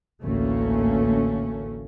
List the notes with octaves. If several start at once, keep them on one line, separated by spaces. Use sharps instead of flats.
A1 D2 A2 A3 A#3 C#4